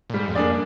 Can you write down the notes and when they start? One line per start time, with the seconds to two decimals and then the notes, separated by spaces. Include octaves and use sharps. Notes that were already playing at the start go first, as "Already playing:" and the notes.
0.10 A#2
0.13 G#2 G3
0.28 F2
0.35 A#3 D4 G#4 D5